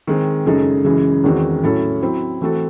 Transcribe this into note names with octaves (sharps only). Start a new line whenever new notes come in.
D#3 G#3 C4
F#2 C#3 G#3 D#4 A4
F#2 C#3 E3 G#3
E2 D#3 G#3 C4 F#4
A2 F#3 C#4 E4 A4
F#3 C4 E4 C5
E3 A3 C4 F#4 A4